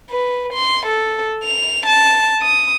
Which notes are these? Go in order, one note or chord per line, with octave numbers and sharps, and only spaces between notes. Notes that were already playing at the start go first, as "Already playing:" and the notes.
B4
C6
A4
F7
A5
D#6